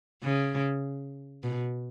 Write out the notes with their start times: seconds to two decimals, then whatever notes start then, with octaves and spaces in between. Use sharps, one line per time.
0.23 C#3
1.43 B2